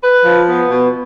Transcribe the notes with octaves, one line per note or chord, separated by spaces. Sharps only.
B4
F3
B3
B2